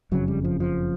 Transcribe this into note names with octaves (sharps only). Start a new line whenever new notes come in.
F#1 F2 C#3 F#3
G3
F3
F3